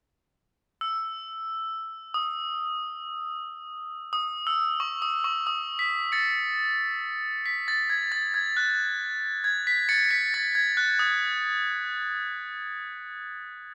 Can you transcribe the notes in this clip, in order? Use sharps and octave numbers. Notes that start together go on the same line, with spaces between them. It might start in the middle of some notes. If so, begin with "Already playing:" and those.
E6
D#6
D#6
E6
C#6
D#6
C#6
D#6
B6
A6 C#7
B6
A6
G#6
A6
G#6
F#6
G#6
B6
A6 C#7
B6
A6
G#6
F#6
D#6